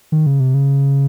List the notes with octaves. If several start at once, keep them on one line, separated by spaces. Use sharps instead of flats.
D#3
C#3
C3
C#3